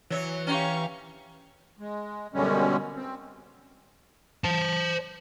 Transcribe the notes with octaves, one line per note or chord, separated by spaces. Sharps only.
E3 F#3 C#5
C#4 G4 F5 A#5 C#6
G#3
F#2 B2 D3 G3 G#3 C#4
C4
C5 A5